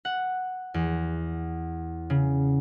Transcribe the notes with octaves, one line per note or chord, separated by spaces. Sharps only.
F#5
E2
C#3